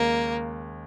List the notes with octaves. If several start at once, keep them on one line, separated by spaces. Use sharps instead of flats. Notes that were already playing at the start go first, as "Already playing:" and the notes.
Already playing: D#2 C#3 G#3 A#3